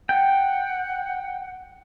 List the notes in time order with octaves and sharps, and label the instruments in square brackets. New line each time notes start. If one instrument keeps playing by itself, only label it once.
[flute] F#5 [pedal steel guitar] G5